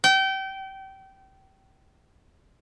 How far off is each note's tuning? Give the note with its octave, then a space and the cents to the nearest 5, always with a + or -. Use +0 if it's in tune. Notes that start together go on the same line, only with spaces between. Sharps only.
G5 -30